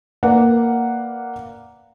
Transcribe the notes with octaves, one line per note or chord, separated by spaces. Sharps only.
A#3 B4 D5 F#5